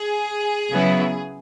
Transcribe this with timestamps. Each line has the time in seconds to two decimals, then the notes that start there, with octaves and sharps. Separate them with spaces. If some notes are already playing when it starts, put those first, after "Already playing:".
Already playing: G#4
0.71 C#3 F#3 B3 E4